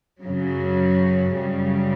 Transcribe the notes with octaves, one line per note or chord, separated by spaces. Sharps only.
F#2 C#3 F#3
F#2 C#3 G3